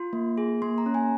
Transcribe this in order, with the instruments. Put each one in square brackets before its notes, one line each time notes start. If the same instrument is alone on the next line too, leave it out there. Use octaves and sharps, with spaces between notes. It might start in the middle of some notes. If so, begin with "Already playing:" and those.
Already playing: [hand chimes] F4 C6
A#3
G#4
A#3 C6
A#5
C#4
G#5